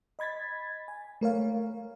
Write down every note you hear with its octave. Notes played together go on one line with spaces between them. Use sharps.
D#5 B5 G#6 A6 B6
G#5
A3 A#4 C#5 F5